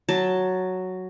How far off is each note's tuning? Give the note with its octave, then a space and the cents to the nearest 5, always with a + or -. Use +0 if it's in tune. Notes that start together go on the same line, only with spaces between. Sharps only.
F#3 +0 A5 +5